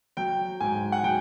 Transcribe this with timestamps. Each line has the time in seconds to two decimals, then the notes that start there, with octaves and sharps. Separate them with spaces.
0.17 F#3 G5
0.60 G#2 G#5
0.92 F#5
1.04 F#3 G5